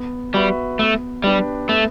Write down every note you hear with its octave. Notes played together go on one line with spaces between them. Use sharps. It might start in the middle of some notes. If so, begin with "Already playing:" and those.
Already playing: B3
G3 F#4 B4 E5
A3 B3
G3 D4 G4 B4
A3 B3